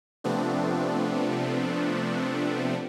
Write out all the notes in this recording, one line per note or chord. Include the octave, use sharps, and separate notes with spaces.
C3 F3 A3 B3 C4 D4